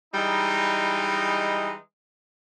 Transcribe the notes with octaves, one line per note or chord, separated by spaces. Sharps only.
E3 G3 G#3 D#4